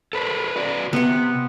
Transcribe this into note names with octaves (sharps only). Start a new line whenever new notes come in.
A4 B4 C5
F#4 B4 D5
C3 B3 F#5